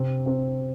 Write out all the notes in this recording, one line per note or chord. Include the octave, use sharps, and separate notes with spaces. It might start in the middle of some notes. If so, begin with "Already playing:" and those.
Already playing: C3 C4
C4